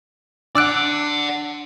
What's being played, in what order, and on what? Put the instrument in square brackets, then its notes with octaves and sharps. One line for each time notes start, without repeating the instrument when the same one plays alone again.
[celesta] D4 D7 [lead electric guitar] D5 F#5 [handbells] D6 E6 F#6